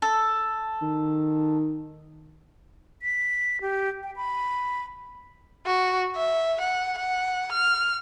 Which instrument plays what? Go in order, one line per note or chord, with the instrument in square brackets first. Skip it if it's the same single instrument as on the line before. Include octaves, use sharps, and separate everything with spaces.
[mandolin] A4
[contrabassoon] D#3
[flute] B6
G4
G5
B5
[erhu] F#4
E5
F#5
F#5
F6